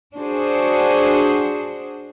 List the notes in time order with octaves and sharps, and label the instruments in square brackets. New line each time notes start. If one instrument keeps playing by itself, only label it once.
[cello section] D4 F#4 G#4 C5